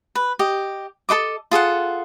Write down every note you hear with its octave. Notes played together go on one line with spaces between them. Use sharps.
B4
G4 D#5
A4 C5 D#5 D6
F4 G#4 A4 F#5